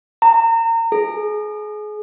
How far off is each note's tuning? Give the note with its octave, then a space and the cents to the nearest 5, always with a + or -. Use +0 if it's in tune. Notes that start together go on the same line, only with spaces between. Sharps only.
A#5 -30
G#4 +30